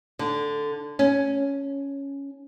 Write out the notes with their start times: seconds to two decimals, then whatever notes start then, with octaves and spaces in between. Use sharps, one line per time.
0.19 D3
0.99 C#4